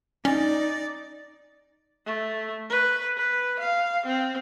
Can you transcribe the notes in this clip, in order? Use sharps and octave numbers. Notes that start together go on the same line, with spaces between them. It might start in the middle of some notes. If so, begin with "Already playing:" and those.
C#4 D#4 D5
A3
B4
B4
F5
C4